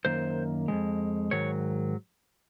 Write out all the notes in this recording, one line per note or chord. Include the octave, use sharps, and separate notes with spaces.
F#2 D#3 A#3 C5
F2 C#3 G#3
G#2 D#3 F#3 C#5